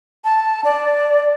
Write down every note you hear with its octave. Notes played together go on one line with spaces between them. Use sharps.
A5
D5